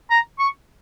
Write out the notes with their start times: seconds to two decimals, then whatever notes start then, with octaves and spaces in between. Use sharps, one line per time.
0.11 A#5
0.39 C#6